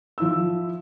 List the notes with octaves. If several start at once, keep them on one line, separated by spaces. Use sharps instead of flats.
F3 E4 E6